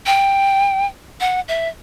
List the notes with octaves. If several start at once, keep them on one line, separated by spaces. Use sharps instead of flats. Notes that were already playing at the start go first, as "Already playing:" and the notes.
G5
F#5
E5